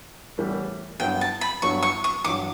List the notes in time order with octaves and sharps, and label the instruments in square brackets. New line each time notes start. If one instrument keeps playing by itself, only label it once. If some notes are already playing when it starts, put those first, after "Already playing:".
[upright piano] A2 E3 G3 B3
[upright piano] G2 F#3 B3 E4 [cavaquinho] G5
[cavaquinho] A5
B5
[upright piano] G2 F#3 B3 E4 [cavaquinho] C#6
[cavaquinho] C#6
C#6
[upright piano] A1 G2 F#3 [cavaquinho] D6